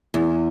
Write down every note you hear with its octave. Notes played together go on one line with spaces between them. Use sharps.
E2